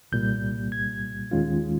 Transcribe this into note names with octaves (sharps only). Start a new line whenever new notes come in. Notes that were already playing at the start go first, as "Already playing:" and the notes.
C2 A#2 G3 G6
G#6
D#2 D#3 G#3 C#4 F4